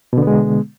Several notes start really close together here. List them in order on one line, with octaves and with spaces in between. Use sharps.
B2 D3 B3 G#3